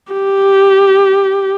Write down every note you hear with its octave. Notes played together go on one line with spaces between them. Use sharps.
G4